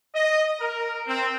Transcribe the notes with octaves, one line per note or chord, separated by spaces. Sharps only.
D#5
A#4
C4